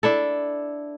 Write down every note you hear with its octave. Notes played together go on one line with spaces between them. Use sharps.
D4 E4 A4